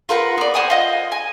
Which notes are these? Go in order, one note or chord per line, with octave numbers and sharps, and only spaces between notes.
F4 A#4 B4 F#5
B3 D5
C5 F#5 G#5 D#6
F4 D#5
G#5